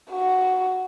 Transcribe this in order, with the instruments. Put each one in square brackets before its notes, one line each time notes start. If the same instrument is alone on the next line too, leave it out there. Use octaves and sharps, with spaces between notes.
[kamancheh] F#4